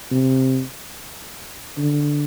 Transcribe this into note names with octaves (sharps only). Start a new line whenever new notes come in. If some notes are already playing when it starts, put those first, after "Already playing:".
C3
D3